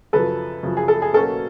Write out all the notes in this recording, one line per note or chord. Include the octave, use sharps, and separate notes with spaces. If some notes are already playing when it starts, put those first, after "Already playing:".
F#2 C#3 F3 A4 B4
F#2 C#3 F3
G#4
A4
G#4
B2 F#3 A#3 C#4 A4